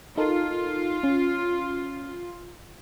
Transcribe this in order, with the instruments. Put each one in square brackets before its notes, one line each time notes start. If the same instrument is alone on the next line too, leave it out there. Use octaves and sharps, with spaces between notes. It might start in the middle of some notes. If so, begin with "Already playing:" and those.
[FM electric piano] D#4 A4 A#4 [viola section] F4
[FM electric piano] C#4